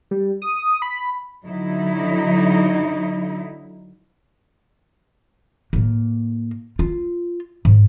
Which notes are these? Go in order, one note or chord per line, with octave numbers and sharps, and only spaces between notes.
G3
D#6
B5
D3 F#3 D#4 E4
A2 A#3
F4
G#2